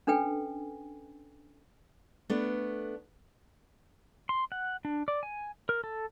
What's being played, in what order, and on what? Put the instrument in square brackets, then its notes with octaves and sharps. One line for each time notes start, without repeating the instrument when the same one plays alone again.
[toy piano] C#4 D4 A4 B4 G5 G#5
[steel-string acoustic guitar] A3 B3 D4
[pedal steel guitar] C6
F#5
D4
D5
G#5
A#4
A4